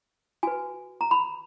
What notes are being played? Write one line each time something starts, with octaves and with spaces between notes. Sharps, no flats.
F#4 B4 G#5
A#5
B5